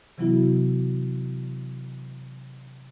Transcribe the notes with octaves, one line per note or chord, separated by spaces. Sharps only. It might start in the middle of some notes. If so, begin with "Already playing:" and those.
C3 E3 F#3 B3 E4 F#4